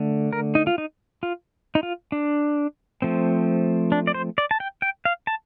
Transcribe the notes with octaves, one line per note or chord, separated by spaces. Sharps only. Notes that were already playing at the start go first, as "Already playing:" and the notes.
Already playing: D3 A3
A#4
D#4
F4
D#4
F4
D#4
F4
D4
F3 A3 C4
D4
D5
C5
D5
A5
G5
G5
F5
A5